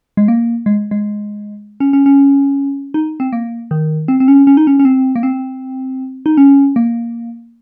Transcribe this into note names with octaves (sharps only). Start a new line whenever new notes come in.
G#3
A#3
G#3
G#3
C#4
C#4
C#4
D#4
C4
A#3
D#3
C4
C4
C#4
C#4
D#4
C#4
C#4
C4
A#3
C4
D#4
C#4
A#3